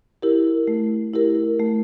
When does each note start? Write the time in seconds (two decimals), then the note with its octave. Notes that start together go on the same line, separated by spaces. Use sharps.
0.22 E4 G4 A#4
0.68 A3
1.13 E4 G4 A#4
1.59 A3